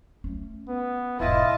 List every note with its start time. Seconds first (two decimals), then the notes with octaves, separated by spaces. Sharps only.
0.24 A3 C#4
0.68 B3
1.20 E1 G#2 E4 F4 D#5 A5